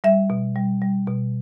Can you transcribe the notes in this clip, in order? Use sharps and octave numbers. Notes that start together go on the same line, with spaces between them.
G3 E5
B2
G3
G3
B2